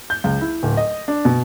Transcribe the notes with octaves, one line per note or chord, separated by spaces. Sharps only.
G6
C#2
E4
D1
D#5
D4
B2